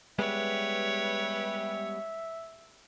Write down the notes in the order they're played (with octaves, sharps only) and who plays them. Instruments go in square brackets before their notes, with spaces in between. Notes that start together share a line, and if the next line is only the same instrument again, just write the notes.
[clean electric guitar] G3 G#3 B3 [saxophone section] G4 B4 [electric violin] C#5 [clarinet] E5